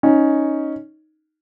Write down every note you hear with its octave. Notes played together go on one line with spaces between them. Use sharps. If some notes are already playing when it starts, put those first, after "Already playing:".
C#4 D#4